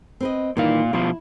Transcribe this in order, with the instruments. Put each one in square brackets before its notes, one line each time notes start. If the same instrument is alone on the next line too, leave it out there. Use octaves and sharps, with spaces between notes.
[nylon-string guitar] C4 B4 D#5
[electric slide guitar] A#2 F5 [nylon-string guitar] D#3 E3 G3
[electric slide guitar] B2 F3 F4 [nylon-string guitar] E4